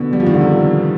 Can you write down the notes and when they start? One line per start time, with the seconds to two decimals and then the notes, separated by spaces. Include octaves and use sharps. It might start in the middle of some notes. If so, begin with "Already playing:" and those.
Already playing: B2 D3
0.13 G3
0.20 F3
0.26 D#3
0.34 D3
0.41 C3